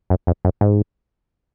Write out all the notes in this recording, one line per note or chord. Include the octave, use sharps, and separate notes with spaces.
F#2
F2
F#2
G#2